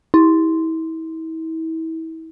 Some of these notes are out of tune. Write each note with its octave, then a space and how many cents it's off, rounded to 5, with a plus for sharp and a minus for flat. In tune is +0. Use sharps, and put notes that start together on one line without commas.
E4 -35